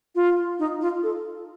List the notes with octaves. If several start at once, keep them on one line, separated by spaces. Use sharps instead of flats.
F4
D#4
F4
A4